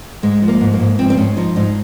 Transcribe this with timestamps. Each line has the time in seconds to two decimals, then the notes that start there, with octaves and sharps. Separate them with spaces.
0.23 G#2 G#3
0.42 F3
0.48 A#3
0.61 G#2
0.74 A#3
0.80 G#2
0.99 F3 C4
1.10 C4
1.17 G#2 C#4
1.37 F3 D#4
1.56 G#2 D#4